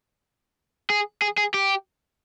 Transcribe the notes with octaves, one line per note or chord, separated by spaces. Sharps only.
G#4
G#4
G#4
G4